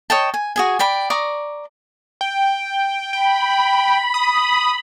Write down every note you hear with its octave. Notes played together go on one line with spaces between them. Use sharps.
C#5 D#5 G5 A5
G#5
F#4 G#4 G#5
D5 G5 B5
D5 A#5 C#6 D#6
G5
G5 B5
D#6